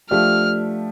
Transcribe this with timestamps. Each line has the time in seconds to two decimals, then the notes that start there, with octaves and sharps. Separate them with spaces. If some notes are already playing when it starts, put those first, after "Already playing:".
0.10 F3 A3 D4 G4 F6